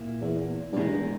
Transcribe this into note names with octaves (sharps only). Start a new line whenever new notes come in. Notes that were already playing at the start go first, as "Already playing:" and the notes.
Already playing: A#2 A#3 E4
E2
G2
E2 B2 G#3 B3 D#4 A#4